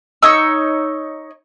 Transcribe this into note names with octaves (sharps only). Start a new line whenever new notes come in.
D#4 C#5 E6